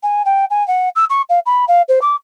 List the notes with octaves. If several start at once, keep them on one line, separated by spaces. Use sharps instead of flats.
G#5
G5
G#5
F#5
E6
C#6
F5
B5
F5
C5
D6